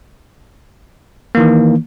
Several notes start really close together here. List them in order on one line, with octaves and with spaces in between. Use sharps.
A#3 E3 D#3